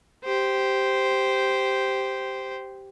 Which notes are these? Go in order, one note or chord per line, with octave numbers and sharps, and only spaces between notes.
G4 C5